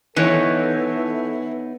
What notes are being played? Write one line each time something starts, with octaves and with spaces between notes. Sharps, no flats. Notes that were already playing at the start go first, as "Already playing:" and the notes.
E3 B3 D#4 A4 C#5